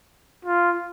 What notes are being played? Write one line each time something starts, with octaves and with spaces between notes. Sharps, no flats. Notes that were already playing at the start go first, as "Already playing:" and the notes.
F4